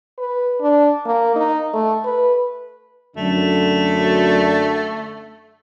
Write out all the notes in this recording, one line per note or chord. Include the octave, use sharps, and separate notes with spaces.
B4
D4
A#3
D#4
A3
B4
F#2 D3 A3